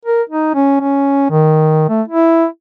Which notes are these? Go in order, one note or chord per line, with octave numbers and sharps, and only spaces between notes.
A#4
D#4
C#4
C#4
D#3
A3
E4